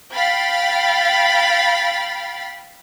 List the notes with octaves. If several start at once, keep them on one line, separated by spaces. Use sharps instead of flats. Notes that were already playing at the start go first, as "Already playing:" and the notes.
F5 G5 B5 A6